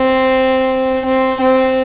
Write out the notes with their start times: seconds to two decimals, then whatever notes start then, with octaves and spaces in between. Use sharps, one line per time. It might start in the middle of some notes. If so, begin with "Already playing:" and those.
Already playing: C4
1.06 C4
1.41 C4